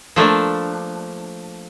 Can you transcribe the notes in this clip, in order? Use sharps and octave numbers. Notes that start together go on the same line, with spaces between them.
F3 A3 A#3 D4